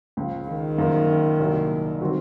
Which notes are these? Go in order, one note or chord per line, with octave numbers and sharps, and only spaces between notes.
C#2 C#3 F3
D#3
F#2 F3 A#3
C2 A#2 F#3
D#3 F#3 C4 F#4